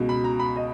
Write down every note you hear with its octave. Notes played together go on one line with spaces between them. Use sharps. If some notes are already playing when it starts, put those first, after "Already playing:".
Already playing: C#2 B2
B5
A#5
B5
D#5